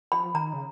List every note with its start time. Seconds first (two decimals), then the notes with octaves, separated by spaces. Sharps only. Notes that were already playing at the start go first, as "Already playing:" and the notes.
0.12 F3 B5
0.34 D#3 A#5
0.53 C#3